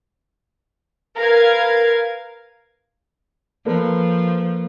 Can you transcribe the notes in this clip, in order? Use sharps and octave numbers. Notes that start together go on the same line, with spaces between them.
A#4 B4 F5 G#6
F3 A#3 A4 B4